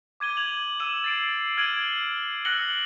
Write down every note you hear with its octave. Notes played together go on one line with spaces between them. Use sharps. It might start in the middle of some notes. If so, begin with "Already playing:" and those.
D6 G#6 D#7 G7
G#6 F7 F#7
E6 D#7 E7 F#7
A6 C7 D7
F6 G#6 D7 D#7 F#7
E6 F#6 A#6 C#7 F#7 G7